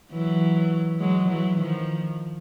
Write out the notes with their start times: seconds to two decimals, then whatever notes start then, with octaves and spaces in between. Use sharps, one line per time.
0.12 E3 F#3
0.99 F#3 G#3
1.29 E3 F#3
1.58 D#3 F3